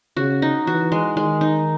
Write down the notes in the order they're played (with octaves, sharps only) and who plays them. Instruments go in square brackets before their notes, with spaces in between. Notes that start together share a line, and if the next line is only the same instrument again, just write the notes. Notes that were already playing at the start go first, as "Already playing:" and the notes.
[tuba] C#3 [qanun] F#4
[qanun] D#4
[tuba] E3 [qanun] F#4
[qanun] G#3
[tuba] D#3 [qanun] G#3
[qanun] D#4